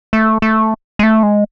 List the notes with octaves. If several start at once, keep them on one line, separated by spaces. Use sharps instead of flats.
A3
A3
G#3
A3
G#3